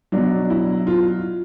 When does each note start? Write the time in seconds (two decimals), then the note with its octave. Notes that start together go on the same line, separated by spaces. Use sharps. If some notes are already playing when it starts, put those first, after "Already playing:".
0.12 B2 F#3 D4
0.50 E4
0.87 F4